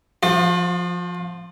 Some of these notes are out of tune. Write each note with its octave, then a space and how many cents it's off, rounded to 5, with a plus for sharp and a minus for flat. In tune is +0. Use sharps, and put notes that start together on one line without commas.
F3 +0 F4 +45